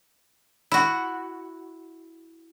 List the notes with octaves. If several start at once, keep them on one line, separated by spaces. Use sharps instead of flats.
E4 F#4